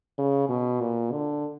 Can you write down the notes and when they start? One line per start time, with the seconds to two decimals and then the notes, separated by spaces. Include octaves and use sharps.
0.18 C#3
0.49 B2
0.81 A#2
1.12 D3